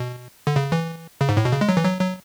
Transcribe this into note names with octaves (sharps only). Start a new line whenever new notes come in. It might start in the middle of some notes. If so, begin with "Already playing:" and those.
Already playing: B2
D3
C#3
E3
C#3
G#2
A2
B2
C#3
G#3
F#3
E3
F#3
F#3